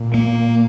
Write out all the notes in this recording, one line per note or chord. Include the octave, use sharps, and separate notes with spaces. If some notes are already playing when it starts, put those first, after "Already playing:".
Already playing: A#2
A#3